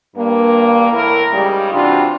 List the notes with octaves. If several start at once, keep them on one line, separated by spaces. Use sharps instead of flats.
G2 A#3
A2 E3 A#4
G#2 C#3 G3
C3 E3 D4 F4 F#4